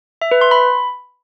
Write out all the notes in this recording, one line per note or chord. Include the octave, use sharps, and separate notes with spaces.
E5
B4
C6
B5